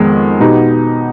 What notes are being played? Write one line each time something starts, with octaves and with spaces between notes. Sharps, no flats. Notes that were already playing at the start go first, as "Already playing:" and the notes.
Already playing: F2 D#3 G#3 B3
B2 B3 D#4 G4